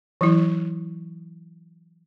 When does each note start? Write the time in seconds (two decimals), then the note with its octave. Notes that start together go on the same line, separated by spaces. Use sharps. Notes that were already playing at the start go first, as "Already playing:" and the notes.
0.21 E3 F#3 E4